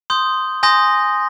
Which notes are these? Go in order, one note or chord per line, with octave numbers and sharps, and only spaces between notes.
C6 D#6 G6
G#5 C6 D#6 G6 A#6